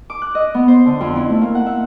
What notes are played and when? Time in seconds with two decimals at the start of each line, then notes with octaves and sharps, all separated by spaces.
0.10 D6
0.22 F#6
0.35 D#5
0.55 B3
0.68 C5
0.86 D3
1.00 F2
1.15 E4
1.30 A3
1.41 A#3
1.55 F#5
1.66 E5